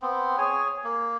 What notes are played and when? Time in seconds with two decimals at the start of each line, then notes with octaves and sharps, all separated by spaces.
0.02 B3 C4
0.38 G#4 C#5 G#5
0.84 A#3